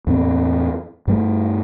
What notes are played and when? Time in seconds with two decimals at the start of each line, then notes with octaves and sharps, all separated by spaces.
0.07 E2 A2 C4
1.07 G2 G3 A3